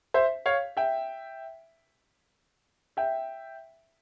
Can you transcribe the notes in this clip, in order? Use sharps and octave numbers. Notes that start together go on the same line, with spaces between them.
C5 E5
C#5 F5
E5 G5
E5 G5